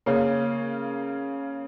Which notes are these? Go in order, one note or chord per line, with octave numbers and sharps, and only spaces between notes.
C#3 A#3 C#4